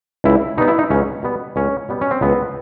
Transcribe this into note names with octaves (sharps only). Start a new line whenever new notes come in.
C#2 E4
B2 G3 B3 D#4
E4
D#4
C#2 C#4
B2 G3 B3
C#2 C#4
B2 G3 B3
C#4
C4
C#2 B3